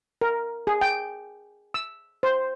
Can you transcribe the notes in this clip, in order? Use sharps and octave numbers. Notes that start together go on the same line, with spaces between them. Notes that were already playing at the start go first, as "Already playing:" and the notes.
A#4
G#4
G5
E6
C5